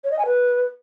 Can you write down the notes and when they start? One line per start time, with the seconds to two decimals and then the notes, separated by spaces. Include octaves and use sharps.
0.04 C#5
0.11 D#5
0.19 G#5
0.26 B4